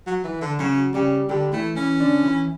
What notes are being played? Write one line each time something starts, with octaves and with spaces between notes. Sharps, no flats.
F#3
E3
D3
C#3 F#3 F#4
C#3 G3 G4
D3 G3 G4
E3 A3 E4
E3 C#4 E4
D3 D4
E3 E4